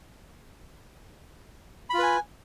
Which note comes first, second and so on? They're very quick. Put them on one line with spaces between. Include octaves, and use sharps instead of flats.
B5 F4 B4 G#5